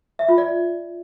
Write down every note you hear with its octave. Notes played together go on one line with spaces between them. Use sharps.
E5
F4
D5